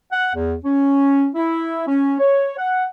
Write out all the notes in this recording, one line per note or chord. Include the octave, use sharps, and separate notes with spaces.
F#5
E2
C#4
E4
C#4
C#5
F#5